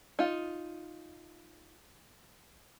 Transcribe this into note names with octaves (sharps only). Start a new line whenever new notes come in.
D#4 F4